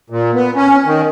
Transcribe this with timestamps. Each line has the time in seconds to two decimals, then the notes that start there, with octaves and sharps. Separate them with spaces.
0.10 A#2
0.34 B3
0.56 C#4
0.85 D#3